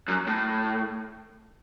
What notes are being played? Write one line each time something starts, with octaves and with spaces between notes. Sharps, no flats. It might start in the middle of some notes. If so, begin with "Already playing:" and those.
F#2
A2